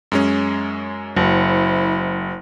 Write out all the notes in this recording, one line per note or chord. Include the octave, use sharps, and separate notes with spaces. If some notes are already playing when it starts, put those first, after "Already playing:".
F#2 G#3 C#4
F#1 E4 C5